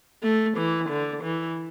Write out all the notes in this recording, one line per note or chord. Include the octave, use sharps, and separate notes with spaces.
A3
E3
D3
E3